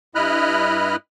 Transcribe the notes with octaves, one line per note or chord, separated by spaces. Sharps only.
G2 E4 D#5 B5 F6 F#6